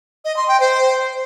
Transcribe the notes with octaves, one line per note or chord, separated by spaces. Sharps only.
D#5
C6
G5
C5